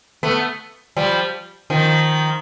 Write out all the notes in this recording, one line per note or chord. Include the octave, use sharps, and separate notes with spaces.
A3 B3
F3 G3
D#3 F3